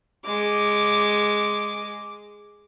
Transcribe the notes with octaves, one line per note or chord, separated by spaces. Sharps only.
G#3 D6